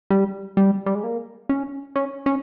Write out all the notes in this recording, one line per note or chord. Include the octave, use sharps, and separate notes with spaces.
G3
G3
G3
G#3
A#3
C#4
C#4
C#4